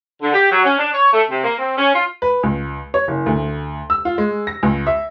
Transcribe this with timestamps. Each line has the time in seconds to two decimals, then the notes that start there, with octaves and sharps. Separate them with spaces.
0.22 D3
0.34 G4
0.50 F#3
0.64 C#4
0.78 D4
0.93 C#5
1.13 A3
1.29 C3
1.44 A#3
1.59 C4
1.77 C#4
1.94 F4
2.22 B4
2.43 C#2
2.94 C#5
3.08 F#1
3.26 D2
3.90 E6
4.05 F4
4.18 G#3
4.47 A#6
4.63 C#2
4.87 E5